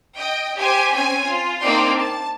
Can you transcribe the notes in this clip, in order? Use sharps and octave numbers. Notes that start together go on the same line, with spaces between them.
D#5 G5
G4 C5 G#5
C4 C#4 G#5
F4
A#3 C4 D4 D#4 D5 C6
A5